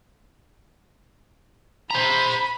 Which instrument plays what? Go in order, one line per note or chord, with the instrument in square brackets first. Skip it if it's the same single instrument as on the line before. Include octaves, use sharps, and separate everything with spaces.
[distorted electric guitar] C5 A#5 [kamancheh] B5